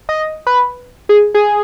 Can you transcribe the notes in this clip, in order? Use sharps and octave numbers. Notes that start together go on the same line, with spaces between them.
D#5
B4
G#4
G#4